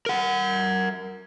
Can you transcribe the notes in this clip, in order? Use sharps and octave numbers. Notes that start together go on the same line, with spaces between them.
A#4 F#5